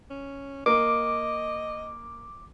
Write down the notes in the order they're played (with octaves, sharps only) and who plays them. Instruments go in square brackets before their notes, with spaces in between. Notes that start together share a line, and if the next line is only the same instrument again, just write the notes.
[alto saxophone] C#4
[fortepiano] A#3 [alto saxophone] D#5 [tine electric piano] D6